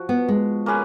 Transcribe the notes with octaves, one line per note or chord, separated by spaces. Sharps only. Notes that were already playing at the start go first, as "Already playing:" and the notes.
Already playing: F3 F#4
B3
G#3
A#3 C#4 G#4 B4